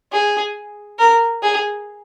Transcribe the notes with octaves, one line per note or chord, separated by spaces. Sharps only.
G#4
A#4
G#4